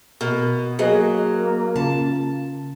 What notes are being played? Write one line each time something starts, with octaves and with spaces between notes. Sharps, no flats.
B2 A#4
F#3 A#3 G#4 B4 D#5
C#3 F4 A5